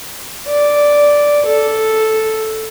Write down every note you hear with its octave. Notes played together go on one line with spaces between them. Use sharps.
D5
A4